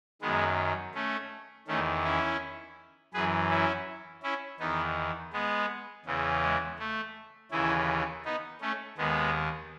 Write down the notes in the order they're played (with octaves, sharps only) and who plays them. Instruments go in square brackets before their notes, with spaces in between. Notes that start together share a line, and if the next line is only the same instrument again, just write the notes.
[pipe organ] F#2 D#3 G#3 B3
A3 C#4
E2 D#3 A3 C#4
C#4 E4
F#2 E3 G#4 B4
C#4 E4
C#4 E4
E2 D#3 B3 D#4
G#3 B3
E2 C#3 E3
G#3
A3
D#2 C#3 E3 C#4 E4
B3 D#4
A3 C#4
D#2 D#3 G#3 B3